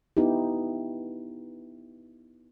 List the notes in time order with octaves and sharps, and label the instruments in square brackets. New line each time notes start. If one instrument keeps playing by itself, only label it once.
[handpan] B3 D#4 E4 G4